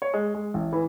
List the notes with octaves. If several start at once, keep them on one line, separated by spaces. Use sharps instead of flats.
C#5
G#3
G#3
A1
E3